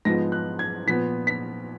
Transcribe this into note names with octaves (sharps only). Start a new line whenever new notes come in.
G#2 F3 G#3 B3 A#6
F#6
G#6
A#2 F3 B3 B6
B6